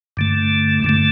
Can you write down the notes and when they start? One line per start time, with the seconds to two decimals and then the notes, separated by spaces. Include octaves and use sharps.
0.17 G2 D3 A3
0.84 G2 D3 A3